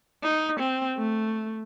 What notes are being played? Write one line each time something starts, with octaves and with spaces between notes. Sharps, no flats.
D#4
C4
A3